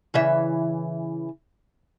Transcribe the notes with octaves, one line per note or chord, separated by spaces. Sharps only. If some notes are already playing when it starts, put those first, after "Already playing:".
C#3 E3 E5